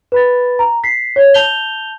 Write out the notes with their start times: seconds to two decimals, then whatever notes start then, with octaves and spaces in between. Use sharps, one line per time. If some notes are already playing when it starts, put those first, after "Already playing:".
0.12 B4 B5 A6
0.59 A#5
0.84 B6 C7
1.16 C#5
1.34 A5 G6 F7 G7